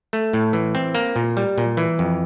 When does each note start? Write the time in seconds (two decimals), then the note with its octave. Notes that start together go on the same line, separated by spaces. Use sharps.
0.13 A3
0.33 A2
0.53 E3
0.75 C4
0.95 A#3
1.16 A#2
1.37 G3
1.58 A#2
1.77 E3
1.99 F2